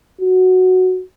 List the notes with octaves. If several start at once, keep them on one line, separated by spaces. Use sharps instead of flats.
F#4